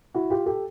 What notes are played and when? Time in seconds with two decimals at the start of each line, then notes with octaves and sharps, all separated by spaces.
0.14 E4 F#4
0.30 F4 G4
0.46 G4 A4